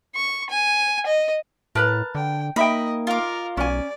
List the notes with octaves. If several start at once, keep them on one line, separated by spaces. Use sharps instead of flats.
C#6
G#5
D#5
A2 A#4 B4 A5 A#5
D3 G5
A#3 D#4 D#5 E5 G5 B5
F4 A#4 D6
B1 C#4 D5 G#5